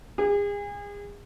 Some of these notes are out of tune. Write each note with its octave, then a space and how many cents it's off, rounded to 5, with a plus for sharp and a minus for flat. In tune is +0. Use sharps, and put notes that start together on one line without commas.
G#4 -35